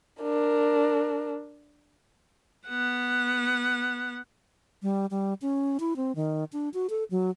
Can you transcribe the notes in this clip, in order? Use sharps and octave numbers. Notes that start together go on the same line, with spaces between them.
D4 A#4
B3 F#5
G3
G3
C#4
E4
C4
D#3
D4
F#4
A4
F#3